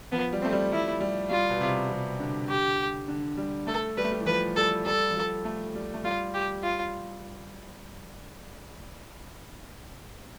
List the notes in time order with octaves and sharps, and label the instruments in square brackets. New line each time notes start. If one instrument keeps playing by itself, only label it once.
[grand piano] F3 [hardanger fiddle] B3
[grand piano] G3
[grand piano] A3 [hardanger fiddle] C4
[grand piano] G3
[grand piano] G3 [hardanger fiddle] E4
[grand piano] G3
[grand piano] G3 [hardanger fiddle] F4
[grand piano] B2
C3
C3
D3
[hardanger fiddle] G4
[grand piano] D3
G3
[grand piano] A3 [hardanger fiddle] A4
[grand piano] G3 [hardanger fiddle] B4
[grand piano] A3
G3
E3
[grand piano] F3 [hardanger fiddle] B4
[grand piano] G3 [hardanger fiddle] A4
[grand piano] G3 [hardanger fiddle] A4
[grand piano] F3
G3
A3
G3
A3
[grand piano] G3 [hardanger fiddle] F4
[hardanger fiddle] G4
F4